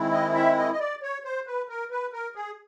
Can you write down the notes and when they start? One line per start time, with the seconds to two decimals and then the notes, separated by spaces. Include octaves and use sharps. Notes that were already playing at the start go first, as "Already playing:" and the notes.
Already playing: D#3 G#3 C4 E4
0.12 D#5
0.35 E5
0.58 D#5
0.72 D#5
0.79 D5
1.03 C#5
1.24 C5
1.47 B4
1.69 A#4
1.91 B4
2.13 A#4
2.35 G#4